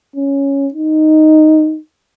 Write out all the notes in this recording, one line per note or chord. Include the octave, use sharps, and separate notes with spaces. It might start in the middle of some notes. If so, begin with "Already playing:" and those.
C#4
D#4